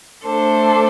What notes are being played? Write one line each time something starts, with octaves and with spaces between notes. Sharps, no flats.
A3 D4 A4 C5